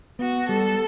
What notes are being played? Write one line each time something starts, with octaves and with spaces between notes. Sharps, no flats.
B3 F#4
G3 A4